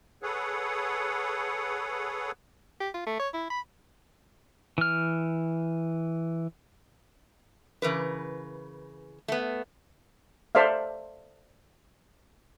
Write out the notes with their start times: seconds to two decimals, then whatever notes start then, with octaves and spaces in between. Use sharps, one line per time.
0.23 G#4 A4 B4 C#5 F#5
2.80 G4
2.94 F4
3.06 A3
3.20 C#5
3.34 E4
3.51 B5
4.78 E3 F6
7.82 C#3 E3 A#4 B4
9.28 A3 B3
10.55 A4 C5 D5 E5 F5